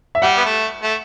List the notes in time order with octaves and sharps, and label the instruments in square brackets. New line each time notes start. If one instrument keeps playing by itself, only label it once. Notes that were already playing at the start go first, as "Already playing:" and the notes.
[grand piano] E5
[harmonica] G3 [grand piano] F#5
[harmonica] B3
A3
A3